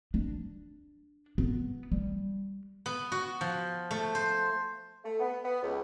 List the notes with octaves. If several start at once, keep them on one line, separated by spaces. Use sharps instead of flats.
D4
B3
G3
B3
F#4
F3
A3
C5
A3
B3
B3
C#2